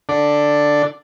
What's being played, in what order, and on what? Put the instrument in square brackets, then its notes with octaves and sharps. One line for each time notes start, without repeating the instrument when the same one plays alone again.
[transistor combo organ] D3 D4 A4 D5